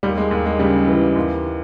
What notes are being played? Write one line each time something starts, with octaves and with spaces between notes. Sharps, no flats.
D#2 G3
G#3
D#2
G#3
C#3 G3
E3
D#2